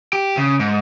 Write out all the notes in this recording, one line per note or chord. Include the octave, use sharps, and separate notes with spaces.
G4
C#3
G#2